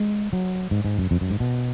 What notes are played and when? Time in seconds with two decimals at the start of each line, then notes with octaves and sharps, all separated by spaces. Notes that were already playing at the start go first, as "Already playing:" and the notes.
Already playing: G#3
0.33 F#3
0.71 G#2
0.85 G#2
0.98 F#2
1.11 F2
1.21 F#2
1.30 G#2
1.40 B2